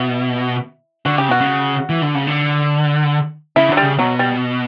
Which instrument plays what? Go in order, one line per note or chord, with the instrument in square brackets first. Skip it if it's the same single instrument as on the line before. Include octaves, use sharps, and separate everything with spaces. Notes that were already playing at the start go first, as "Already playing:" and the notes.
Already playing: [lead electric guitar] B2 [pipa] E4
[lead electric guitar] D3 [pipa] F#4
[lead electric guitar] C#3 [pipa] G4
[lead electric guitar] B2 [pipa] F#4
[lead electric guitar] C#3
E3
D3
C#3
D3
[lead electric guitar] C#3 [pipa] E4
[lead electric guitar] D3 [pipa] F#3
[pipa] G3
[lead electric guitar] C#3
[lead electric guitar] B2 [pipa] F#3
[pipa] G3